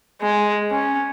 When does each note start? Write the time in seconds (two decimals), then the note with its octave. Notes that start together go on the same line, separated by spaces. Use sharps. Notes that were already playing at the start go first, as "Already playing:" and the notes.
0.21 G#3
0.71 C#4